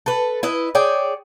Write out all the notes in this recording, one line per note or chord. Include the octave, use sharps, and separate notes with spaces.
A4 B4
E4 B4 D#5
G#4 C#5 D5 G5